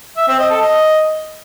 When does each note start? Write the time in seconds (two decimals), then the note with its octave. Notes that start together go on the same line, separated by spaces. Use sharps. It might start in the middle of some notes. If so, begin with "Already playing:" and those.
0.17 E5
0.28 C4
0.39 D#5
0.50 A4
0.61 D#5